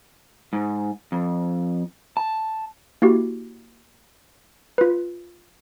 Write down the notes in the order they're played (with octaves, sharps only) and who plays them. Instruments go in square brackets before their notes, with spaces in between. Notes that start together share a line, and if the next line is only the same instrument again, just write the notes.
[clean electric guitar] G#2
F2
A5
[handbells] A#3 E4 F#4 G4
F4 B4